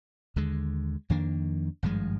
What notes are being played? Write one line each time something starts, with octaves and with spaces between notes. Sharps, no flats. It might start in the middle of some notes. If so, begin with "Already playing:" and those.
D#2 D3 G#3
F2 D#3 A#3 D4
G#1 G2 F3 G#3